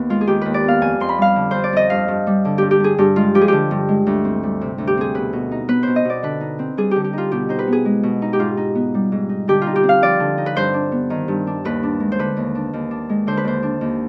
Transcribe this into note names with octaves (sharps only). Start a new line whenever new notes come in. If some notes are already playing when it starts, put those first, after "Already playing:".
Already playing: D#2 B3 B4
G#3 F4
G#4
D#3 G4
D#2 B4
D5
B3 F5
F2 G#5
F2 C6
B5
G3 F5
D3
F2 C5
D5
F2 D#5
G2 F5
G2
G3
D3
G2 G4
G4
G2 G#4
G2 G4
G#3 F4
F3 G4
G#4
D3 G4
G2
G#3
D2
C4
G3
C3
D2
G4
C4 G#4
B2 B4
B2
D#4
B3 B4
B2 C5
D#5
B2 D5
D3 B4
D#4
C4
G3 G#4
D3 G4
G4
D#4 F4
B2 G4
D#4 C5
B4
B3 G#4
G#3
B2
D#4
G4
G#2 F4
D#4
B3
G3
G#2
D#4
D3 G4
F4
D#4
G4
C4
F5
F3 D5
D3
D#4
B4
G2 C5
D4
B3
D#3
G2
D4
D#2 B4
D4
G#3
C5
D3 B4
D#2
D4
D#2
D4
G#3
D3 C5
B4
D#2 C5
D4
D#2